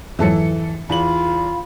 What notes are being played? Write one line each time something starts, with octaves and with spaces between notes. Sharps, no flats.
F2 G#2 E3 F#3 A4 C#7
E2 F4 F5 B5 F#7